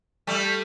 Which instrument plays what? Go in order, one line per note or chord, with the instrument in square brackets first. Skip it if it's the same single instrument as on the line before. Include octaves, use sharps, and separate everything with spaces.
[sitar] G3 A3